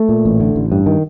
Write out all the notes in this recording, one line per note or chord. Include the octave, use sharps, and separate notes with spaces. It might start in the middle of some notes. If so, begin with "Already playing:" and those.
Already playing: A3
A#2
A1
D3
A1
G2
D#3